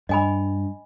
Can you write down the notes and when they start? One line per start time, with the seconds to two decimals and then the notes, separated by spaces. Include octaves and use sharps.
0.09 G2 D#5 G#5 B5